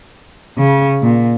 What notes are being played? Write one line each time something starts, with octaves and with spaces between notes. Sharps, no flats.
C#3
A#2